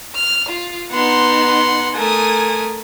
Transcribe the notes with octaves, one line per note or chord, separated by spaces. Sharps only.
F6
F4
B3 D#4 F#5 C6
A3 A#4 G#5 D#6